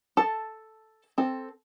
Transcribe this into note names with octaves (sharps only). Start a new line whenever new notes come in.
A4 A5
C4 A4